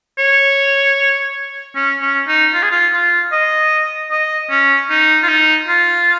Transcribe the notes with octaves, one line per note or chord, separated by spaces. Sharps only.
C#5
C#4
C#4
D#4
F4
G#4
F4
F4
D#5
D#5
C#4
D#4
F4
D#4
F4